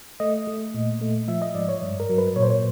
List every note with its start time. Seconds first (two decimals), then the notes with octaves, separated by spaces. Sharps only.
0.20 A3 D#5
0.47 A3
0.74 A#2
1.01 A3
1.28 F3 E5
1.42 D#5
1.55 G#2 D5
1.69 C#5
1.82 G2
2.00 A#4
2.09 F#3
2.18 B4
2.36 A#2 C#5
2.43 C5
2.50 C#5